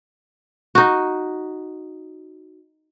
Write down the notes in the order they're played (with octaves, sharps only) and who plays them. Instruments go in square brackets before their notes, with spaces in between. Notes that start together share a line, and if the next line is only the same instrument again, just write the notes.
[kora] D#4 F#4